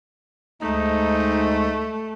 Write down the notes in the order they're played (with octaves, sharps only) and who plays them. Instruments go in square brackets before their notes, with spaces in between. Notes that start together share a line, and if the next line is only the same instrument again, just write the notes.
[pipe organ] D2 G#3 [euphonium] G#2 [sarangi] A3 [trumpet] D#4